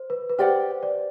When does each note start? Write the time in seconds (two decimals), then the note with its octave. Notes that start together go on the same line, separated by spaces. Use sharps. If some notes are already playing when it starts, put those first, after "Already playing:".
Already playing: C5
0.10 B4
0.30 B4
0.38 G4 C5 D5 F#5
0.83 D5